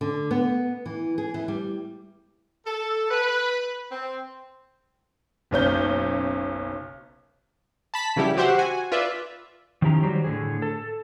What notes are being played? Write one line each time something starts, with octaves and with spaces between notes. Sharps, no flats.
D3
B3
E3
G#4
E3
G3
A4
B4
C4
F#1 B1 C#4 G6
A5 B5 B6
C#3 E3 F#3 G3 E4 G4
F#4 G4 C5 E5 F#5
F#4 G#5
F4 B4 D5 E5
D#3 F3 C#4 E4 G4 A#5
D#3 F#3 G3 F#4 G4 C5
A2 D3 G#4
A4